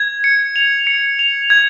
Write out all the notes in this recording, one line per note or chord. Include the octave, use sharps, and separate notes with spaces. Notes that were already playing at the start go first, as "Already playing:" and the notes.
Already playing: G#6
C#7
F7
C#7
F7
G#6